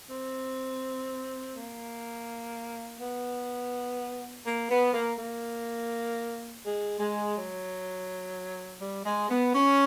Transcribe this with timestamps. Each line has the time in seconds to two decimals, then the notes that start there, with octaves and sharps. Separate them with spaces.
0.10 C4
1.55 A#3
3.00 B3
4.45 A#3
4.70 B3
4.94 A#3
5.18 A#3
6.64 G#3
6.99 G#3
7.36 F#3
8.82 G3
9.05 G#3
9.30 B3
9.54 C#4